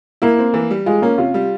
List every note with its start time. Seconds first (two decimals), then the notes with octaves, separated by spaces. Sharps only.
0.22 A#3 E4
0.39 C4
0.54 E3
0.70 G3
0.86 G#3 F4
1.02 A#3 C#4
1.18 C3 F4
1.34 G3